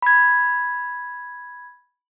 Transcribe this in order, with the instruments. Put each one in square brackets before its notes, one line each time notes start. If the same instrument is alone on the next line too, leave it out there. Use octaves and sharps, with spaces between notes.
[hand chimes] B5 G#6